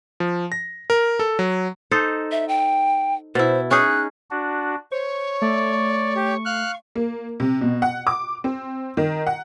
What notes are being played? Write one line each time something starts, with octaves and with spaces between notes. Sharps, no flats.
F3
A#6
A#4
A4
F#3
D#4 A4 C5
E5
G5
B2 E4 C5
C#4 D#4 G#4 F#6
D4 F#4
C5 C#5 C#6
A3 D5
G4
F5 F6 F#6
A#3
C3
B2
F#5
D6
C4
D#3
F#5